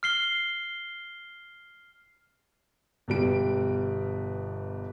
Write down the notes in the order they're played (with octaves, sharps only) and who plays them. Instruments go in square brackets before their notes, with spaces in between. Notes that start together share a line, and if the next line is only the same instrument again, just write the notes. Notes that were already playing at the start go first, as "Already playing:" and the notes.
[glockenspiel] F6 C7 G7
[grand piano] G1 B2 G3 D7